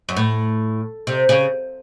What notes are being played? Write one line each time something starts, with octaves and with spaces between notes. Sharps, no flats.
F#2
A2
C3
C#3